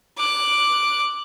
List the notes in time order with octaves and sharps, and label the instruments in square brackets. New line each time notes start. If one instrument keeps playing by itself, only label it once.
[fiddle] D6 F#6